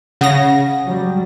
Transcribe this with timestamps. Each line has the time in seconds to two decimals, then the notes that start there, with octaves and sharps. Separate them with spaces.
0.21 C#3 F#5 D#6 A#6
0.86 F#3 G3